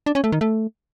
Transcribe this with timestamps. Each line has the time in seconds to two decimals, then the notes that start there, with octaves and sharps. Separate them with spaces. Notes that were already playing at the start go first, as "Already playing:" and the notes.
0.06 D4
0.15 C#4
0.24 A3
0.32 D#3
0.41 A3